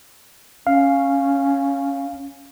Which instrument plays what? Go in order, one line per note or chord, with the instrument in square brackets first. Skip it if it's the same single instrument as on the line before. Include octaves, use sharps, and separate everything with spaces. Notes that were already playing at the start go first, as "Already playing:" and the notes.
[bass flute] C#4 [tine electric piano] F5